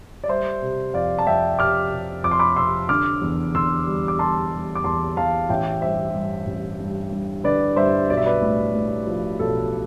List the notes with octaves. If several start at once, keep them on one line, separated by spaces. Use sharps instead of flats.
D5
G3 C5 E5
C3
F2 D5 F5
A5
F2 E5 G5
C3 D6 F6
C3
F2 D6
C6
B5 D6
C3 C6 E6
D3 D6 F6
E2
D3 C6 E6
G3
D6
G3 A5 C6
G3
D6
E2 A5 C6
E2 F5 A5
A1 E5 G5
G2 C5 E5
G2
A1
G2
G2
D3 B4 D5
G2 C5 E5
B1 D5
E5
B4 D5
A2
A2
F3
B1 A4